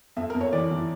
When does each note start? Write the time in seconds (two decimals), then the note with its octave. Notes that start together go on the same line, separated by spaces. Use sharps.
0.16 F2 E5
0.30 F2 A#4
0.41 C#5
0.53 E3 D5
0.71 E3